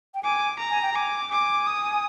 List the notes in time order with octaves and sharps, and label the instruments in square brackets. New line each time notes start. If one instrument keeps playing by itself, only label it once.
[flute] G5
[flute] G#5 [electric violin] D6
[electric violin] A#5
[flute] G#5
G5
[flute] G#5 [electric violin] D6
[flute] G#5 [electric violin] D6
[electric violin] D#6